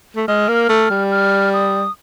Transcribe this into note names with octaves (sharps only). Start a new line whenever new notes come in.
A3
G#3 F6
A#3
A3
G3
F6
D#6